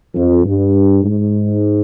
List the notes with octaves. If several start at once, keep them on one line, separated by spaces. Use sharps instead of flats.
F2
G2
G#2